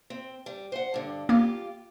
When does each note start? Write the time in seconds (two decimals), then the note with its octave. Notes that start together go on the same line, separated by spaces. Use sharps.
0.10 C4
0.46 G3
0.72 C5 F#5
0.94 G2 D3
1.29 A#3 F4 G4